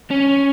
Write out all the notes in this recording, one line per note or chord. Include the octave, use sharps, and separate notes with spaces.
C#4